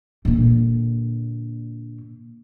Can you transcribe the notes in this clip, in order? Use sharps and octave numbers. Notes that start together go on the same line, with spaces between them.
A#2 D3